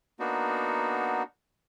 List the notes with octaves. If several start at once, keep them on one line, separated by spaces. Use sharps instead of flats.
A#3 B3 D4 D#4 F#4